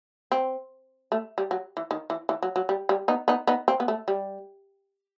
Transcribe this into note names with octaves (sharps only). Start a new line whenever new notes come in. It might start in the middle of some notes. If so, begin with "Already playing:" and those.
C4
A3
G3
F#3
E3
D#3
E3
E3
F#3
F#3
G3
G3
B3 D#4
B3 D#4
B3 D#4
C4
B3
A3
G3